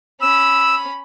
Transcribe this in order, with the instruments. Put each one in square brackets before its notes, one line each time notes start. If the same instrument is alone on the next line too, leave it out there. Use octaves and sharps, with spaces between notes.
[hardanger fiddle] C#4 B5 [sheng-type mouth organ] E6